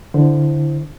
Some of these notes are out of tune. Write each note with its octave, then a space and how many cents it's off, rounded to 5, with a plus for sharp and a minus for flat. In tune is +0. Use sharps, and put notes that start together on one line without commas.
D3 +0 E4 +0 C5 +0